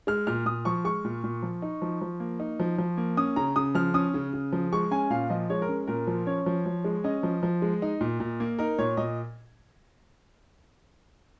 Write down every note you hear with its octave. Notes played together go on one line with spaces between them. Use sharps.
G#3 F6
A#2 F6
A#2 D#6
F3 C#6
G#3 C#6
A#2
A#2
F3
D#4
F3
F3
A#3
D#4
F3
F3
A#3
C#4 D#6
C#3 A#5
C#3 D#6
F3 F6
C#4 D#6
C#3
C#3
F3
G#3 C#6
C#4 G#5
A#2 F5
F3 D#5
G#3 C#5
A#4
C#4
A#2 A#4
F3
C#4 C#5
F3
F3
G#3
C#4 D#5
F3
F3
G#3
D#4
A#2
A#2
A#3
D#4 A#4
A#2 C#5
A#2 D#5